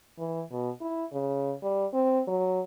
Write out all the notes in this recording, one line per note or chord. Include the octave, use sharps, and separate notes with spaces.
E3
B2
E4
C#3
G3
C4
F#3